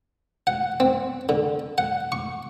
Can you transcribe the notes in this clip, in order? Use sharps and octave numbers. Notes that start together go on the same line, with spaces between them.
F#5
C4
D3
F#5
C#6